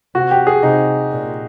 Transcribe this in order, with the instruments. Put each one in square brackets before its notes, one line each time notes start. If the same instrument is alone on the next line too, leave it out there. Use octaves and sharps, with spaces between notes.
[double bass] C3 [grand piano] F#4
[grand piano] G4
G#4
[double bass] C3 [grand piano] D#4
[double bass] A#2